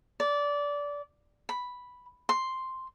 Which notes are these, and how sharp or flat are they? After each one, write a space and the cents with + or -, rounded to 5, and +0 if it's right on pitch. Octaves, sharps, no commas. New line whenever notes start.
D5 -20
B5 +0
C6 +0